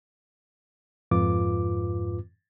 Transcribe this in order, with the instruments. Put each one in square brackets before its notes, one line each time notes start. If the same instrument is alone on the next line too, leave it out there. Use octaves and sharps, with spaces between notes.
[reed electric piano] F2 G#2 F4 B4 D6